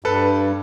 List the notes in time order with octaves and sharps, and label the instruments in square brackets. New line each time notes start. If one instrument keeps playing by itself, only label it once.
[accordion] G2 [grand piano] A4 B4